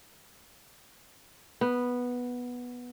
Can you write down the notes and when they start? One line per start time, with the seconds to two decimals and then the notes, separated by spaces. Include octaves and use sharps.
1.61 B3